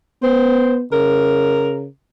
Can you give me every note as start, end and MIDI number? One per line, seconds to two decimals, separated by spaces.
0.23 0.84 59
0.23 0.75 72
0.92 1.86 49
0.92 1.83 70